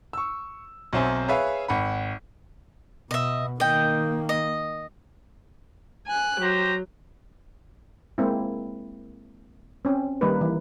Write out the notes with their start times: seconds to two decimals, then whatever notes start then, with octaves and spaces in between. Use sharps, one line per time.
0.13 C#6 E6
0.93 B1 F#3 C4 C5 E5 G#5
1.28 G#4 B4 C#5 E5 F5
1.68 G#1 F#5 B5
3.11 B2 D#5 E5
3.60 D#3 A#3 D#5 G5
4.29 D#5
6.07 G#5 F#6
6.41 F#3 G4 C5 A#5
8.18 G#3 A#3 C4 E4
9.85 C4 C#4
10.21 D#3 G3 A#3 D#4 B4
10.41 E3